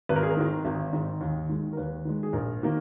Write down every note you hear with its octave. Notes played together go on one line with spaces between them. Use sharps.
G#1 B4
A#4
G#4
A#4
G#2 D#3
G#1
G#2 D#3
D#2
D#3 G#3
A#4
D#2 B4
D#3 G#3
G#4
A#1 A#4
D#3 A#3